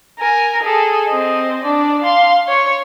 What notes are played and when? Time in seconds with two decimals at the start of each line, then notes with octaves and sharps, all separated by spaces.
0.20 A#4 G#5
0.63 G#4 A4
1.08 C4 D#5
1.63 D4 D5
2.02 F5 C6
2.48 C#5 C#6